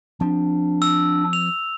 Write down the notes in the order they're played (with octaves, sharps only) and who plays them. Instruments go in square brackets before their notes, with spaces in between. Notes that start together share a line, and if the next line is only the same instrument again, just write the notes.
[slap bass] F3 C4 [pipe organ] D4
[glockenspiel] E6
F7